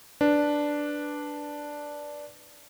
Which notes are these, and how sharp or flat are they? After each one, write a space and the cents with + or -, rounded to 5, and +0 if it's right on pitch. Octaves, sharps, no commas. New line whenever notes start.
D4 +0 B4 +0